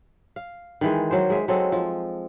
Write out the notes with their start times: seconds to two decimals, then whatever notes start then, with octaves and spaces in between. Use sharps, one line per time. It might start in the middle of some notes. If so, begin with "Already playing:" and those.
0.36 F5
0.81 D#3 E3 G#3
1.11 F#3 C5
1.30 G#3 E5
1.48 F#3 G#3 C4 A4
1.72 F3